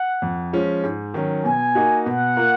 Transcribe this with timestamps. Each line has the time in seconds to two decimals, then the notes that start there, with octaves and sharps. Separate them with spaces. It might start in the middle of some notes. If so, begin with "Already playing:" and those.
Already playing: F#5
0.22 F2
0.53 F3 G#3 C#4
0.83 G#2
1.14 D#3 F#3 C#4
1.45 B2 G#5
1.75 A#3 D#4 F#4
2.06 B2 F#5
2.37 A#3 F4 A#4